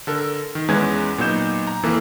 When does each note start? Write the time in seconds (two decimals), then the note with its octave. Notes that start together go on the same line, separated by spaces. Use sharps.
0.07 D3 A4 A#4
0.55 D#3
0.68 E2 G#3 C#4 B4 G#6
1.18 A#2 F#3 B3 D#4 G6 E7
1.67 A#5
1.83 F2 E3 A#3 A4